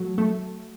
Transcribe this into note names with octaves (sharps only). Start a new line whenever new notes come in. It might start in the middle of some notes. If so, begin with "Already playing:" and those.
Already playing: F#3 A3
A3